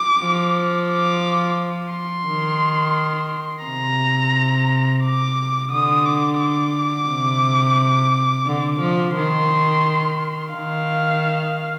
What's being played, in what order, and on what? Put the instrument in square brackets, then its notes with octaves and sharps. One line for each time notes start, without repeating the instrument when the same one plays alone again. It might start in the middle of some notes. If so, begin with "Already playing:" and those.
Already playing: [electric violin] D6
[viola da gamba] F3
[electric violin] D6
C6
[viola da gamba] D#3
[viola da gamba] C3 [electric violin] A#5
[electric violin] D6
[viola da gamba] D3 [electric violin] D#6
[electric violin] D6
D6
[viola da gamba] C3
D3
F3
[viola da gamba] D#3 [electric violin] C6
[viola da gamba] D#3 [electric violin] F5